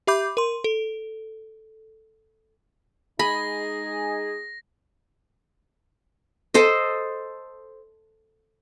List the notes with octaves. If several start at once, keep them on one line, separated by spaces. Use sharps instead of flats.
G4 E5 B5 D6 G6
A#4 C6
A4
G#3 D#4 G#4 B5 A#6
A4 C5 D#5